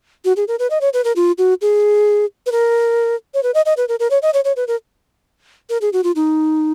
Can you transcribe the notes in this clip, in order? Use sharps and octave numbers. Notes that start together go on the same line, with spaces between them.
F#4
G#4
A#4
B4
D#5
C#5
B4
A#4
F4
F#4
G#4
B4
A#4
C#5
B4
D#5
D#5
B4
A#4
A#4
C#5
D#5
C#5
C#5
B4
A#4
A#4
G#4
F#4
F4
D#4